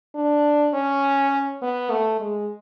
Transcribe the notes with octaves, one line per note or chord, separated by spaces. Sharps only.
D4
C#4
B3
A3
G#3